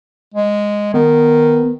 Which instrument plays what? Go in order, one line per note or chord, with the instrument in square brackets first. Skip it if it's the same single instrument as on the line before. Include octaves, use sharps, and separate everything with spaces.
[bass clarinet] G#3
[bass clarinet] D#3 [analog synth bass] B3